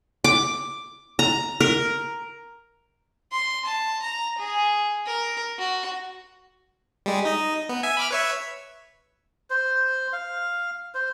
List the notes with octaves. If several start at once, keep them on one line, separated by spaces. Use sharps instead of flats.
D6
A#5
A#4
C6
A5
A#5
G#4
A#4
F#4
G3 G#3
D#4 D#5
B3
E5 G#5
B5 D6 F6
B4 C#5 E5
C5
F5
C5